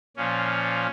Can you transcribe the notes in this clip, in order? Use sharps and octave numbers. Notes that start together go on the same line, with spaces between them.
A#2 F3 C#4